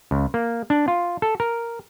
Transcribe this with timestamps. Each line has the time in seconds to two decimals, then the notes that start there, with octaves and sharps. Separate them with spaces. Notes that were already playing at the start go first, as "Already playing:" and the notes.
0.11 C#2
0.34 A#3
0.70 D4
0.88 F4
1.22 A4
1.40 A#4